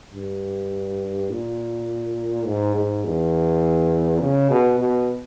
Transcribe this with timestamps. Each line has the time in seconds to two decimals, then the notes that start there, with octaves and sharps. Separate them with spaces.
0.14 G2
1.30 A#2
2.46 G#2
2.75 G#2
3.05 E2
4.21 C#3
4.50 B2
4.79 B2